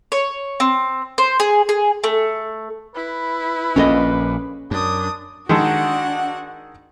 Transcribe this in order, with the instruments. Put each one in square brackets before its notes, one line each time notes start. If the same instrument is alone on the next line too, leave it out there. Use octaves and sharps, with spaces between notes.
[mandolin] C#5
C4
C5
G#4
G#4
A3
[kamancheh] E4 [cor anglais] B4
[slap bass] A#1 A#2 [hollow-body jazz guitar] C#4 A4 D#5
[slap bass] F#2 [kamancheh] D4 D#6
[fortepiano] D#3 G#3 A4 [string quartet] D4 F#4 F#5